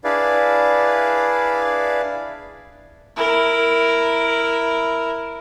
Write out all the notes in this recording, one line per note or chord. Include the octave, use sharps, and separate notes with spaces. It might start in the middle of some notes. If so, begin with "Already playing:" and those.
D4 E4 G#4 B4 D5 F5
E4 A#4